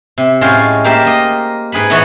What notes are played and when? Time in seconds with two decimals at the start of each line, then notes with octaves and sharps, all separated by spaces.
0.18 C3
0.41 A2 G#3 C#4 F4 F5 G5
0.85 A#3 G4 A#4 C5 D5 E5
1.04 A#3 D#5
1.72 G#2 G#4 B4 B5
1.90 A2 E3 B3 C#5 D#5 F#5